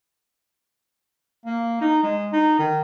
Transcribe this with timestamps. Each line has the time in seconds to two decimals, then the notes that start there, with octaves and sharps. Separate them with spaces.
1.46 A#3
1.81 D#4
2.03 G#3
2.33 D#4
2.59 D#3